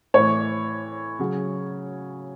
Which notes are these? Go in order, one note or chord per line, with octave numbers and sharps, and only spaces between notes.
A2 E3 C#5
C#3 F#3